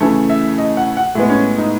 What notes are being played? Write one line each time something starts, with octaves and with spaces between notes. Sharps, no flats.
C#3 E3 A3
E5
D#5
F#5
F#5
A2 G#3 B3
C#4
D#4